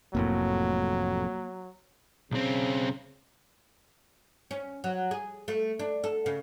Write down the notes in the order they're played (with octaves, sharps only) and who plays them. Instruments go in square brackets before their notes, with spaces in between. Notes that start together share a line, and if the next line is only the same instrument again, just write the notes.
[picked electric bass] F1 F2 A2 [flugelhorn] F#3 [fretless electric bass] A#3
[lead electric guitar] B1 C4 [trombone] C#3
[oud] C#4
F#3
G#4
A3
D4
A4
C#3